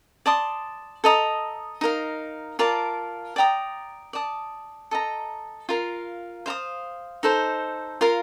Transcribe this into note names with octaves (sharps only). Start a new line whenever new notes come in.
D5 A5 C6 D#6
A4 D#5 A#5 D#6
D#4 A#4 F5
F4 A#4 D5 A5
D5 G5 A#5 D#6
D5 A5 D#6
A4 D#5 A#5
F4 A#4 F5
C5 F5 A#5 D#6
D#4 A4 C5
F4 A#4 F5